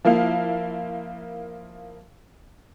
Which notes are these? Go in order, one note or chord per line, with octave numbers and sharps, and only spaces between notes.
F3 A#3 E4 F5